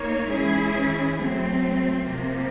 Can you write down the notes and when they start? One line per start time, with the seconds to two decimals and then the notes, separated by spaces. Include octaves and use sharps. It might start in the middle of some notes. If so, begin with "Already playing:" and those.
Already playing: A#3 D#4 C#5
0.28 E3 G#3 C#4 E4 G#4
1.17 F#3 A3 C4
2.04 C3 F3 A#3